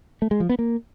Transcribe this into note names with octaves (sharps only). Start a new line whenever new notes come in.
A3
G#3
F3
B3
A#3